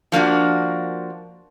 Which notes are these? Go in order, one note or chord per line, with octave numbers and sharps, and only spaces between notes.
F3 A#3 D4 F#4